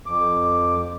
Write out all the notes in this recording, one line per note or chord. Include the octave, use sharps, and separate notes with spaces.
F2 D6